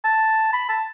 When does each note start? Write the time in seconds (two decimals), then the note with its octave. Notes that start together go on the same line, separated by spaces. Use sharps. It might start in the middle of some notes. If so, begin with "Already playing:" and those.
0.04 A5
0.53 B5
0.69 A5